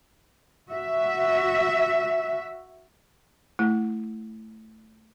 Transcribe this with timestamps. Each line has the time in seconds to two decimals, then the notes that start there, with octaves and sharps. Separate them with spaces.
0.71 F#4 E5
3.59 A3 E4 F#5